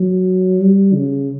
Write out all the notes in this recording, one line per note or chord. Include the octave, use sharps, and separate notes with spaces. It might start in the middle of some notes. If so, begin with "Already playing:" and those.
Already playing: F#3
G3
C#3